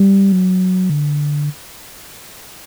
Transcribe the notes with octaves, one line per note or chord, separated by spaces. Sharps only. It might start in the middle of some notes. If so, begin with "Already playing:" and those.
Already playing: G3
F#3
D3